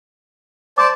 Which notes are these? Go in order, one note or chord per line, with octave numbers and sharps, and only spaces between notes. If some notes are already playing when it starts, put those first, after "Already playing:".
C5 D5 A5 D6